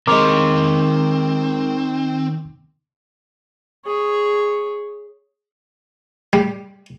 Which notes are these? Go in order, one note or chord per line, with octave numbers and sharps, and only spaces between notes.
D#3 G#3 C4 A#4 C#5 C6 D6
G#4 C#5
G3